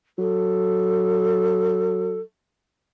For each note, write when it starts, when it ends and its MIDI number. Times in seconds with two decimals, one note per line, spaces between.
0.19 2.19 54
0.19 2.19 69